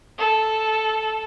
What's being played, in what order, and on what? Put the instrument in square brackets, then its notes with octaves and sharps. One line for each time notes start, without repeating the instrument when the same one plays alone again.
[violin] A4